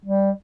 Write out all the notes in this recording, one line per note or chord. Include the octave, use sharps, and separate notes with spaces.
G3